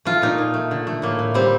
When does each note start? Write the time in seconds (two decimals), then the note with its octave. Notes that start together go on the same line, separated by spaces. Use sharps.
0.05 A3 F4
0.22 A#2 D#4
0.38 A#2
0.54 A3
0.71 D3
0.87 A3
1.02 A2 A#3
1.19 A2
1.34 G3 C4